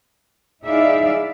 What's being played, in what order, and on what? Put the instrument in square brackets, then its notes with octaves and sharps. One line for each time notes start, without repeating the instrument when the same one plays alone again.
[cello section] D#4 E4 G#4 D5 E5 F5